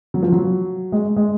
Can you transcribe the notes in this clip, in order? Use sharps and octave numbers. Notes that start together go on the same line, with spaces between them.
F#3
F3
F#3
G#3
G#3